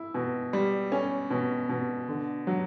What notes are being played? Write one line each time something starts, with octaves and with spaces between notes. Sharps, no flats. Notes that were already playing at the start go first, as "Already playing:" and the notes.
Already playing: E4
B2
G3
C#4
B2
B2
D3
F#3